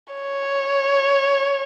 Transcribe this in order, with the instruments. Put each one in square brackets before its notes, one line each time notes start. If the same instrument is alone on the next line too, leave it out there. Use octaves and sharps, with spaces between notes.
[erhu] C#5